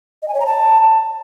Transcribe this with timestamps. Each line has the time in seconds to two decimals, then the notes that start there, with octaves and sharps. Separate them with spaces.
0.22 D#5
0.28 G#5
0.34 C#5
0.40 A#5
0.46 A5